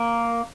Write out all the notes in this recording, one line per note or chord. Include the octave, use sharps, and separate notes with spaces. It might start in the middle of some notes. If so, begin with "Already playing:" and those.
Already playing: A#3